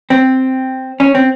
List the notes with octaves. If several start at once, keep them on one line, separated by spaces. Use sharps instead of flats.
C4
C#4
C4